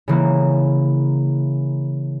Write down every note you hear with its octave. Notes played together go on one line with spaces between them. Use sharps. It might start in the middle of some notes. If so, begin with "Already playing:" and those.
C#3 E3 A#3